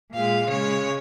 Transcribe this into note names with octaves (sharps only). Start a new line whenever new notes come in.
A#2 G#3 F5
C#3 G#3 C#5